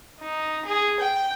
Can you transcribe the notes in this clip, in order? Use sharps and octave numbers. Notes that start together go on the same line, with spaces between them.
D#4
G#4
G5